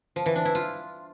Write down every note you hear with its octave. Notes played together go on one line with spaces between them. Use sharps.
F3
E3
D4
E4
F4